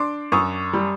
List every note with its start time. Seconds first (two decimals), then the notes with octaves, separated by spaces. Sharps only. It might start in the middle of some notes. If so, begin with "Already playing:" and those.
Already playing: D4 C6 D6
0.32 F#2 C#6 D#6
0.73 G3